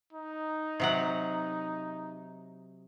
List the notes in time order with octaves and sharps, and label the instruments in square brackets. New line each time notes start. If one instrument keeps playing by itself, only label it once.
[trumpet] D#4
[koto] C3 F#3 F#5